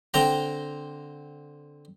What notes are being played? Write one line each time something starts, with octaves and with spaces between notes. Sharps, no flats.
D3 C4 G5 A#5